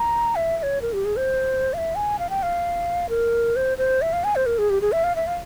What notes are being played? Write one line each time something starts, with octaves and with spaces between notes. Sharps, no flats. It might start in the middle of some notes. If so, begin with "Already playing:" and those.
Already playing: A#5
E5
E5
C#5
A#4
G4
G#4
C5
F5
E5
G#5
F5
G5
F5
A#4
C5
C5
E5
F5
G#5
C5
A#4
G#4
G4
G#4
E5
F5
E5
F5